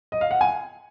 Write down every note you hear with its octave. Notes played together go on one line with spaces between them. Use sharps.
D#5
F5
F#5
G#5